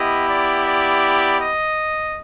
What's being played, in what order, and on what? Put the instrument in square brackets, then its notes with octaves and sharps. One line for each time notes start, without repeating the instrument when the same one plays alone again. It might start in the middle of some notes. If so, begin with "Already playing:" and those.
Already playing: [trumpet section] B3 E4 G4 D#5
D5
D5
D#5